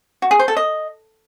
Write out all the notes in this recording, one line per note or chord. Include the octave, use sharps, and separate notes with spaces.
F#4
G#4
C5
A4
D#5